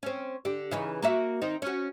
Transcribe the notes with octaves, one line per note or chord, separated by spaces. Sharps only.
C4 C#4
D3 G4
C#3 E3 D#4
A#3 F#4 E5
D#3 C4 D#4
C#4 F#4